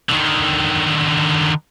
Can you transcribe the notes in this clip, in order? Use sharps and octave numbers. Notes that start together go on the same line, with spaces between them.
D3 D#3